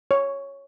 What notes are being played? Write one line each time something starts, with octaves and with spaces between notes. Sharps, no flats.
C#5